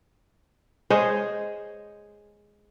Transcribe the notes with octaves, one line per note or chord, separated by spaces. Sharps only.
G#3 G#4 C5 C#5